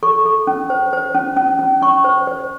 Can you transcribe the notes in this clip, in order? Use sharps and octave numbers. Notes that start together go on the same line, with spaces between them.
A4 C#6
A4
C#4
C5
C5
C#4
C#4
C#4
C#4 C#6
C5
C5